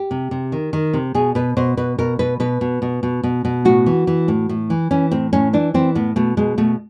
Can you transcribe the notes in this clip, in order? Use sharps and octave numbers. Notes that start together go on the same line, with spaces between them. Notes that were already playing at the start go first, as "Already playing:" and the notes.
Already playing: G4
C3
C3
D#3
D#3
C3
B2 G#4
B2 B4
B2 C5
B2 B4
B2 A#4
B2 B4
B2 B4
B2
B2
B2
B2
B2
A2 F#4
E3
E3
A2
A2
E3
E3 C#4
A2 C4
A2 C#4
E3 D4
E3 C4
A2 B3
B2 A3
B2 G#3
B2 A3